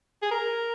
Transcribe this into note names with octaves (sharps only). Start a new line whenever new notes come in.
G#4
A#4